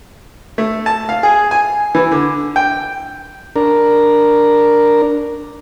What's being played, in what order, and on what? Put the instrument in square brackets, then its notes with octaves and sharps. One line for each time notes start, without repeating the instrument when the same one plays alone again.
[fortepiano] A3
A5
F5
G#4
G#5
E3
D3
G5
[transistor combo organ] D4 A#4